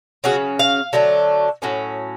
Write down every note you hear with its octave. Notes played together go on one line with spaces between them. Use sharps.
C#3 F#3 C#4 F#4
F5
D3 F#3 A3 D4
A2 F#3 C#4